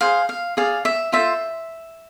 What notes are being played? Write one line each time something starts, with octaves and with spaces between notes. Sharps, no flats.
G#4 C5 F5
F5
G#4 D5 F5
E5
F4 A4 C5 E5